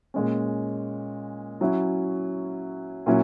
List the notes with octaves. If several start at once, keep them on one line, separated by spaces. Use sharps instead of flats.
A#2 G#3 C#4
F#3 C#4 E4
A#2 F#3 C#4 E4